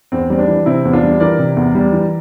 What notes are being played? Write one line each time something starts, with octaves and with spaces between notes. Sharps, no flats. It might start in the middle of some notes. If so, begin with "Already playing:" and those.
E2 C4
G3 C4
D4
E3
C3 C4 E4
E2
D4 F4
G3
E3 A#4 D5
C3
E2
G3
E3